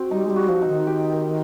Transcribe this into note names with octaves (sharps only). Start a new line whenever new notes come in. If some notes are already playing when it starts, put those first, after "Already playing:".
Already playing: C4 F#4
G3 D#4
G#3
G3
F#4
F3
D#4
D#3
G4
A#4